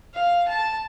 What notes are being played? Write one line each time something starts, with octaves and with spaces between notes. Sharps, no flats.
F5
A5